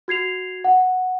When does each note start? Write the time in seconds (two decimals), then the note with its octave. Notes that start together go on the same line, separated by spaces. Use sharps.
0.08 F#4 G#6 C7 F7
0.64 F#5